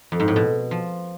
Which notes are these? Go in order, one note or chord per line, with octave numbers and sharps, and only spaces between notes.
F2
G#2
A2
B2
F3